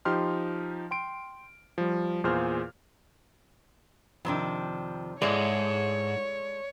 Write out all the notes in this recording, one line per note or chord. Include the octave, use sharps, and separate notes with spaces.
F3 D#4 G4 C6 F6
G5 C6 D7
F3 G3
E2 A#2 F4 G#4 C5 F6
F2 C3 D#3 F3 D4
G#2 G#3 E4 A4 C#5 D5